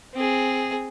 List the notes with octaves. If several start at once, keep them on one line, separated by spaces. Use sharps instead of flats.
C4 G#4